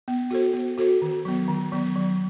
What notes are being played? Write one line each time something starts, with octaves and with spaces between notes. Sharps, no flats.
B3
F#4 A4 C5
B3
F#4 A4 C5
D#3
F#3 B3
D#3
F#3 B3
F#3